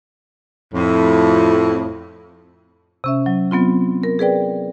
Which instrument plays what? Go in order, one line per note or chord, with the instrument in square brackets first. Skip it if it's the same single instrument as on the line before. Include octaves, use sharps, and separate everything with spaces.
[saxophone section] F2 A2
[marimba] C3 C#4 E5
F#3
F#3 B3 C4 F4
A#4
G#4 B4 D5 G5